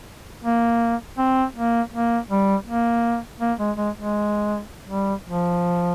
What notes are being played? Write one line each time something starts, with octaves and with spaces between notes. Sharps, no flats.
A#3
C4
A#3
A#3
G3
A#3
A#3
G#3
G#3
G#3
G3
F3